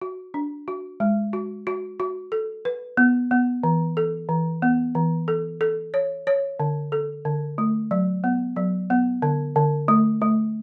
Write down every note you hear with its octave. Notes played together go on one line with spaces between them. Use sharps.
F#4
D4
F#4
G#3
F#4
F#4
F#4
A4
B4
B3
B3
E3
A4
E3
B3
E3
A4
A4
C#5
C#5
D3
A4
D3
A3
F#3
B3
F#3
B3
D3
D3
A3
A3